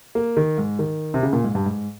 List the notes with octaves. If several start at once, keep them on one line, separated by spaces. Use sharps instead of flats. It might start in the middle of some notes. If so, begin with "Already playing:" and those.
A#3
D#3
G#2
D#3
C3
C#3
A#2
G#2
G2
G#2